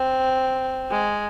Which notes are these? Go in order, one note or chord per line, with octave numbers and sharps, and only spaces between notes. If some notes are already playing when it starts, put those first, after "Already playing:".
Already playing: C4
G#3